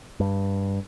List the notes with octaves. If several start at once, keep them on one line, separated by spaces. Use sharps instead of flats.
G2